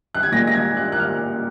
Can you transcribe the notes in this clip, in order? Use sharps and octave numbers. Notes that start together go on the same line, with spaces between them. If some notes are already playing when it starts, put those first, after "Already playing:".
F#6
G#6
A#2 G#3 A#6
A#6
G#6
F#6
F#6
F6